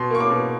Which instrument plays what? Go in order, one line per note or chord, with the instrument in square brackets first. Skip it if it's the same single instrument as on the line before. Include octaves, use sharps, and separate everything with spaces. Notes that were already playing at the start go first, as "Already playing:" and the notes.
Already playing: [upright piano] B2 C6
A#3 C#6
D6
B2